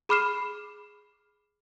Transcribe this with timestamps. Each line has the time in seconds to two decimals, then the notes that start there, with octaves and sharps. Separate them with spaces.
0.09 G#4 B5 D6 F6 C7 E7